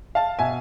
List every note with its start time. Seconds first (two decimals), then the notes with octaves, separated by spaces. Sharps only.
0.15 F5 A5
0.39 B2 E5 G#5